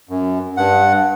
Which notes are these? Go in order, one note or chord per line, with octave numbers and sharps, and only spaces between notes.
F#2
G2 F#5